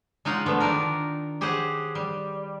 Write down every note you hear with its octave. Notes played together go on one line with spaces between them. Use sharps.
G#3 D#4 F4 C#5 F#5
D3 F3 G#3 A3 B3
D#3 D4 D#4 A#4
G4 G#4 C5 C#5 F#5
G3